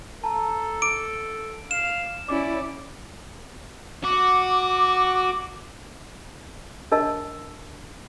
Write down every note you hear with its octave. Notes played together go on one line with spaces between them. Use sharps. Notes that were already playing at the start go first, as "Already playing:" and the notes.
A4 A5 A#5
D6 D7
F5 E7
C#4 E4 D5 D6
F#4 D6
D4 A#4 D#5 A5